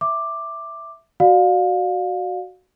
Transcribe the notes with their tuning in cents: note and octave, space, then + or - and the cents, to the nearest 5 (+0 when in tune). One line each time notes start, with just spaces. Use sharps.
E5 +0 D6 +10
F#4 +0 D5 +10 F5 +25